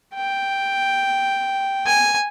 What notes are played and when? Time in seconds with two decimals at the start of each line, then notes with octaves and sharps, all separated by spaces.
0.15 G5
1.86 G#5